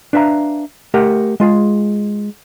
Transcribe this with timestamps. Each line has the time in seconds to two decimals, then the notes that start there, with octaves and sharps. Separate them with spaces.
0.13 D4 B4 E5 F5 A#5
0.94 A3 G4 A#4 F#5
1.40 G#3 F4 G#4